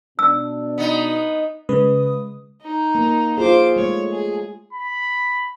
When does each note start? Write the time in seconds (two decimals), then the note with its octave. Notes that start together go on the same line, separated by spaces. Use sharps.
0.19 B2 D4 E6
0.78 B3 D#4
1.69 C#3 G#3 B4 D#6
2.62 D#4
2.95 A#3
3.38 F4 G#4 C5 D6
3.76 G#3 A3 C#5
4.12 G#4
4.73 B5